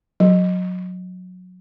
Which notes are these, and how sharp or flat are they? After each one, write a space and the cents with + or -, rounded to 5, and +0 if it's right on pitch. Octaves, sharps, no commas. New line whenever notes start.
F#3 -20